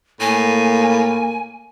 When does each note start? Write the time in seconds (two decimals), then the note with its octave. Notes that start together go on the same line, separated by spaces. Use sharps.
0.20 A2 A#3 G#5